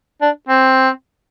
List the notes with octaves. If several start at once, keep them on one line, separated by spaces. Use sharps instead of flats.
D4
C4